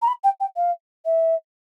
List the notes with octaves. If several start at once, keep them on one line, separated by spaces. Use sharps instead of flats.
A#5
B5
G5
G5
F5
E5